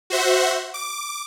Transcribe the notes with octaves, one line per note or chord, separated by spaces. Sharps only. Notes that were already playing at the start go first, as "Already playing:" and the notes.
F#4 C5 E5 F#5
D6